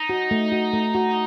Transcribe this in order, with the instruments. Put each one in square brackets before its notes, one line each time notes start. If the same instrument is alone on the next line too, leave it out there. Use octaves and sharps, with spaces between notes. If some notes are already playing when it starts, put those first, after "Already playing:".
Already playing: [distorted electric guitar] D#4
[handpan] F#4
A3
F#4
A3
F#4